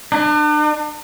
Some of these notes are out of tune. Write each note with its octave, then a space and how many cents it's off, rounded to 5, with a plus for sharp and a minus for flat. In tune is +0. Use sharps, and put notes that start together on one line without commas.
D4 +40